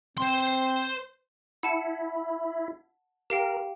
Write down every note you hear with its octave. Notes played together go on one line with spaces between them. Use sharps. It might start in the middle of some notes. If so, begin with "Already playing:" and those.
C4 C5 C6
E4 F#5 A5 C#7
G4 A#4 F5 G5